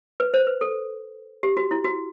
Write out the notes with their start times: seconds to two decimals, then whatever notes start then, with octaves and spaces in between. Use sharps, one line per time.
0.20 B4
0.34 C5
0.47 B4
0.61 A4
1.43 G4
1.57 F#4
1.71 E4
1.84 F#4